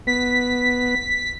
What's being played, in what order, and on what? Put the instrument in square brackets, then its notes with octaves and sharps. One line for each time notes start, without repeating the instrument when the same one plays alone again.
[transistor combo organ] B3 [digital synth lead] B6